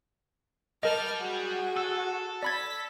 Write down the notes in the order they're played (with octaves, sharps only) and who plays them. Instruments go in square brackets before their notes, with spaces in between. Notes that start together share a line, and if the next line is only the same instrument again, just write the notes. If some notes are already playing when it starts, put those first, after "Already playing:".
[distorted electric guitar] G3 [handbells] A#4 D#5 [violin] A5 F6
[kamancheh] F#4 F#5 [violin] G#4
[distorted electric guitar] A4 [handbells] E6
[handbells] D5 B5 G#6 [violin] B6